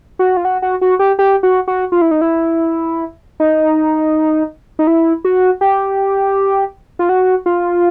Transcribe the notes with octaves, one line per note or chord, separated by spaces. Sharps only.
F#4
F4
F#4
F#4
F#4
G4
G4
F#4
F#4
F4
E4
D#4
E4
D#4
D#4
E4
F#4
G4
F4
F#4
F4